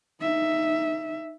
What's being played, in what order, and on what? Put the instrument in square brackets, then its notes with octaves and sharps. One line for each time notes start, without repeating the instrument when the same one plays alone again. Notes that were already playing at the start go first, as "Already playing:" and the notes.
[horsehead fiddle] D#4 E5